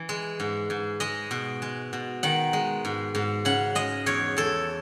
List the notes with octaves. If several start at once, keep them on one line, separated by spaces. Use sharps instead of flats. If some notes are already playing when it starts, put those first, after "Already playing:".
Already playing: E3
G#3
G#2
G#2
G#3 D#5
B2
G#3
B2
D#3 F#5
G#3
G#2
G#2
C#3 F#5
G#3 D#5
E2 C#5
E2 A4